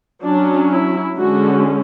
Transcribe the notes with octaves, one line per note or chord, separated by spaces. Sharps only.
F#3 C#4 D4
E4
D3 G#3 C#4 F#4